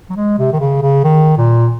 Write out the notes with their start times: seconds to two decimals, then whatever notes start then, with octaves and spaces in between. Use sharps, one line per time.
0.10 F#3
0.16 G#3
0.38 C3
0.53 D#3
0.60 C#3
0.82 C#3
1.04 D#3
1.37 A#2